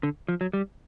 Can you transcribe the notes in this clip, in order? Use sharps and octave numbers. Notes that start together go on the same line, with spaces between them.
D3
F3
F#3
G3